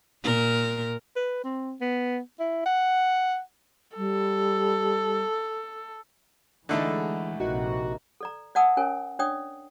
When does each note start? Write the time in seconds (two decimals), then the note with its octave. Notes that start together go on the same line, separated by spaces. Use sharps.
0.24 A#2 A#4
1.16 B4
1.44 C4
1.81 B3
2.40 E4
2.66 F#5
3.97 G3 A4
6.69 D3 E3 G#3 A3 D#4 E4 F#4
7.40 A#1 C3 D#3 F#4
8.21 A4 D5 A#5
8.55 D5 E5 F#5 A5 D#6 E6
8.77 C#4 A#4 C#5 G#5
9.19 D4 C#5 D5 G5 D#6